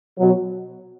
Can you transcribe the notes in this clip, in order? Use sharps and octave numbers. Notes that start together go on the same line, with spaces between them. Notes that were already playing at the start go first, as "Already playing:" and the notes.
B2 F#3